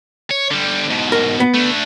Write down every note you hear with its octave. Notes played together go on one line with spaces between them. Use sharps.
C#5
D3 G3
G#2 B2
A#4
B3
A3 D4